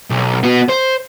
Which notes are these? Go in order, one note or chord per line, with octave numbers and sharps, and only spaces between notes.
B1
B3 F#4
C5